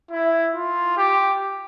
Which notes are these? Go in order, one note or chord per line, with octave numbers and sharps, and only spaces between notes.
E4
F4
G4